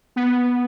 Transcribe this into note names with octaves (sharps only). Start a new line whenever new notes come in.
B3